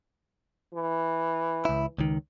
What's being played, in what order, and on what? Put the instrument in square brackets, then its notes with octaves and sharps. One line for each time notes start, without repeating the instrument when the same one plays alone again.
[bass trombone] E3
[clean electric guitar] C#2 E4
C#2 D#3